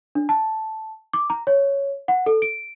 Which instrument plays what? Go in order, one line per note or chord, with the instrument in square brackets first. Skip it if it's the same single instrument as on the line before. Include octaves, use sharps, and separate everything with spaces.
[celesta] D4
A5
D6
A#5
C#5
F#5
A4
D7